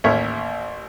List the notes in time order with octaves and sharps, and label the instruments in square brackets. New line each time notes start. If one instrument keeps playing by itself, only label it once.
[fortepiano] A1 D#2 A#4 C#5 E5